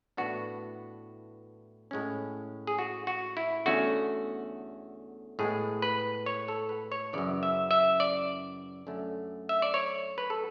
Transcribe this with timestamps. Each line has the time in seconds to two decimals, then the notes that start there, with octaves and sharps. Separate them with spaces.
0.17 A2 E3 B3 D4 F#4
1.91 A2 G#3 C#4
2.67 G#4
2.78 F#4
3.07 F#4
3.37 E4
3.66 E2 D3 A3 C#4 F#4
5.39 A2 G#3 B3 G#4
5.82 B4
6.26 C#5
6.48 A4
6.69 B4
6.92 C#5
7.13 F#2 C#3 E3 D5
7.43 E5
7.71 E5
8.00 D5
8.87 F#2 D3 A3 C#4
9.49 E5
9.62 D5
9.74 C#5
10.18 B4
10.30 A4